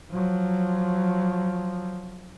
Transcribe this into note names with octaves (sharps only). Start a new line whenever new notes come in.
F3 F#3